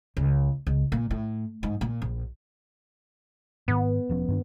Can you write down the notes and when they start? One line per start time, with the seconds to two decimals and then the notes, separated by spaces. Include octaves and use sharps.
0.17 C#2
0.67 C#2
0.92 A#2
1.11 A2
1.63 G#2
1.81 A#2
2.02 A#1
3.68 G#2 D#3 B3
4.09 E1 F3 C#4
4.28 G2 D#3 D4